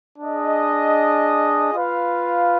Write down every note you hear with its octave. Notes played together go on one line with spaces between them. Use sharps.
D4 G#4 D#5
F4 B4 F5